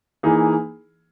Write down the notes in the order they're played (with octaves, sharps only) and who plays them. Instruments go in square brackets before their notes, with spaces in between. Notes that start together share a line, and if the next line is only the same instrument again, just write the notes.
[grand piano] E3 A#3 D#4 G#4